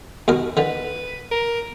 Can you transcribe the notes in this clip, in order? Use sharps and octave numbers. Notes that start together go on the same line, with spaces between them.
D#2 B2 A#4
D3 D#3 B4
A#4